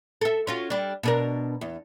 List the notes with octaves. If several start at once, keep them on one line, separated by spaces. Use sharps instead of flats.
A4 E5
C#4 F4 F#4
G3 D4
B2 D4 A#4
E2